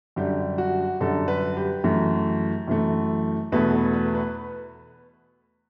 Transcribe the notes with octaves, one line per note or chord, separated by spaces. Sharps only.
F#2 D3 G3 G4
F#4
F#2 D3 G3 A4
B4
G4
F#2 E3 A3
F#2 E3 A3
E2 B2 A3 B4
A4
B4
B4